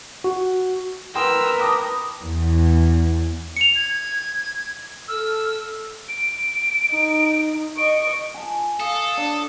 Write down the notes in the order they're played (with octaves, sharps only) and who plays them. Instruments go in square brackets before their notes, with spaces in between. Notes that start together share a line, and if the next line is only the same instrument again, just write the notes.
[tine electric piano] F#4
[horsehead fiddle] A#4 B4 [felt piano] G5 C6 D#6 [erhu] E6
[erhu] G5 [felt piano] A5 B5 D6 [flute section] D#6
[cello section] E2
[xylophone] C#7 F7
[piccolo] G#6
[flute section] A4 F6 [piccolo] E6
[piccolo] D7
[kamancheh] D#4
[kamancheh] D#5 C#6 [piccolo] D7
[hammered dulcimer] G#5 A5
[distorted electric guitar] A4 [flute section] F5 D#6
[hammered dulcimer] D4